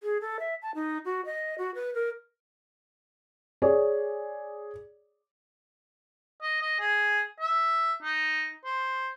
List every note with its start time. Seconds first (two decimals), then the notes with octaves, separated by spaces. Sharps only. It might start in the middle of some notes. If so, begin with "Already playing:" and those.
0.03 G#4
0.21 A4
0.40 E5
0.62 A5
0.75 D#4
1.05 F#4
1.25 D#5
1.58 F#4
1.75 B4
1.94 A#4
3.62 G#4 C#5 D5
6.42 D#5
6.61 D#5
6.80 G#4
7.41 E5
8.03 D#4
8.65 C5